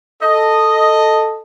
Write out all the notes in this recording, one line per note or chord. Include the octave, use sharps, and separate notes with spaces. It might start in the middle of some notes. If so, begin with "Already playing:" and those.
A4 D#5